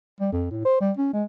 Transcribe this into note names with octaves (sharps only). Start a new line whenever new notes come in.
G3
F2
A2
C5
G3
C#4
G#3